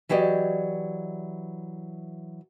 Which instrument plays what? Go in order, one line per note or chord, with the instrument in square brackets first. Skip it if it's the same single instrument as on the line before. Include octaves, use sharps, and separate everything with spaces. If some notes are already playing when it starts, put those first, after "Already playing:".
[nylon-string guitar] E3 F#3 G4 D5 D#5